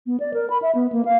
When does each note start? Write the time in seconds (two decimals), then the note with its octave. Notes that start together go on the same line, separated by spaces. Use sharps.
0.06 B3
0.20 D5
0.34 A#4
0.50 B5
0.62 E5
0.75 B3
0.92 A#3
1.05 F5